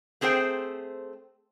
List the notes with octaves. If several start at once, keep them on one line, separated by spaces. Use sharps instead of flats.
A3 C4 G#4 C5 G5